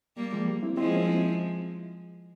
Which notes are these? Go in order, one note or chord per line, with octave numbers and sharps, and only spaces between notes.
G3 A#3
F3 G#3
G3 A#3
C4 E4
F3 G#3 C4 E4
A#3 C#4
C4 E4